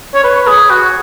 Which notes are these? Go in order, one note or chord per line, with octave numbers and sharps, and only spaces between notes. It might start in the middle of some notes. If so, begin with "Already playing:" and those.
C#5
B4
G#4
F#4